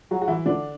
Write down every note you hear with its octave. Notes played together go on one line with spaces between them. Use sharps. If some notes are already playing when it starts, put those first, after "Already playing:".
F#3 F#4
F#4
E3 E4
D3 D4